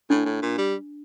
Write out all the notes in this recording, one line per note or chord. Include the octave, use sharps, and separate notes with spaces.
A2 D4
A2
A#2
G3